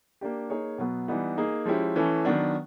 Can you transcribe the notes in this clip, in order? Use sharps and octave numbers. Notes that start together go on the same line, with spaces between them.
A#3 D4 G4
A#3 D#4 G#4 C#5
B2 F#3 B3
E3 G3 B3 D#4
A#3 D#4 G#4
F3 G#3 C#4 E4 G4
E3 A3 C#4 E4 A4
D#3 F#3 B3 D4